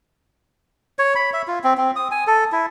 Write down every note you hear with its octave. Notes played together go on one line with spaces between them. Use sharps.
C#5
B5
E5
F4
C4
C4
D#6
G#5
A4
E4